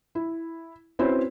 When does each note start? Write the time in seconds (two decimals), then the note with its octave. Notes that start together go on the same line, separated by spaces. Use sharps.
0.15 E4
0.99 C4 C#4 E4 F#4 B4 C5